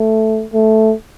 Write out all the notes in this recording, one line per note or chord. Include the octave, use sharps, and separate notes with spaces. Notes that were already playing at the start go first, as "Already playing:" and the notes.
Already playing: A3
A3